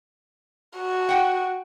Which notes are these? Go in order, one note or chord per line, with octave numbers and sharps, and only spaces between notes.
F#4
F#5 G5